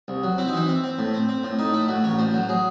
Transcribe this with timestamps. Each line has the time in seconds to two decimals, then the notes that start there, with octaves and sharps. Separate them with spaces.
0.08 C2
0.23 F#3
0.38 C4 E4
0.48 D#4
0.54 E3 E4
0.68 C4
0.84 C4
0.98 A2
1.14 C4
1.29 C4
1.43 A2
1.59 A2 D#4
1.74 A2 E4
1.89 A2 F#4
2.04 A1 C#5
2.18 A2 C5
2.34 F#3
2.49 F#3 G#4